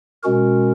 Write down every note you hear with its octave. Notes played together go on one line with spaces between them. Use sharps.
B2 G#3 C#4 F#4 A#4